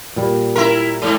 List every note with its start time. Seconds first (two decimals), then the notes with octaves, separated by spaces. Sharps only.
0.16 A#2 G3
0.56 E4 A#4
1.02 G#2